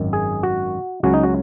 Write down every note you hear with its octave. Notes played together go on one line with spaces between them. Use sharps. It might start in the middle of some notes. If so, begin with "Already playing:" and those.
Already playing: G#1 F#2 D#3
G#4
F#4
C#2 C#3 F#3 C#4 F#4
D#4
F#4